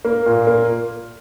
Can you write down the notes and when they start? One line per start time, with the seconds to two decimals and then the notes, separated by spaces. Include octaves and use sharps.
0.05 A#3
0.26 A#2
0.47 A#3